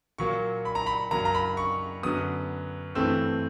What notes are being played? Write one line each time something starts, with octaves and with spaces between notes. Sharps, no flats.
A#2 F#3 A#3 C#6
B5
A#5
B5
F#2 C#3 F#3 A#3 A#5
A#5
B5
C#6
F#2 D3 F#3 B3 D#6
G2 E3 A3 C4 E6